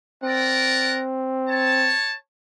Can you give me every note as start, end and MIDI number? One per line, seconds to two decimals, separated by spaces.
0.23 1.95 60
0.23 0.99 70
0.23 0.99 74
0.23 0.99 78
1.48 2.14 73
1.48 2.14 81